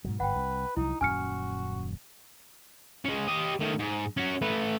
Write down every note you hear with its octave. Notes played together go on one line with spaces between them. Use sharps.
G#2 B2 F#3
G1 G#2 B4 F#5 G5
C2
C2 F3 F#3 D#4 E4
D#1 F#2 C#4 F#4 G#5 F6 C#7
G#3 C#4
G4 D#5
D#3 A3
G#2
C#4 F#4
A3 B4